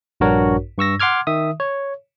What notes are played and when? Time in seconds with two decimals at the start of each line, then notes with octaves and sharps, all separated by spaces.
0.20 A#1 G2 D4 F#4 A#4 C#5
0.78 G2 C#6 E6 A#6
1.00 F#5 C6 D6 F6 G#6
1.27 D#3 E5 D#6
1.60 C#5